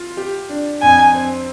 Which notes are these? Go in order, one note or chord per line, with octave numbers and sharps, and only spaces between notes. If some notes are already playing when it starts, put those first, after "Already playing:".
Already playing: F4
G4
D4
F2 G#5
C4